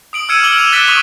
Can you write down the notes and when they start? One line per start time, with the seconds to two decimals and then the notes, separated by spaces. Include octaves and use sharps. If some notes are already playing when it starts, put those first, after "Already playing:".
0.13 D#6 D7 F#7
0.29 E6 F6 G#6 C#7 D#7 E7
0.43 D6 F6 F#7 G7
0.58 D6 D7 E7 F7 G7
0.72 E6 F#6 A6 B6 E7
0.87 C#6 D#6 B6 D#7